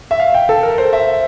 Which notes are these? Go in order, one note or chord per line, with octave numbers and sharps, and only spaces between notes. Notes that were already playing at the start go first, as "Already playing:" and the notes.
E5
F5
G5
A4
A#4
C5
E5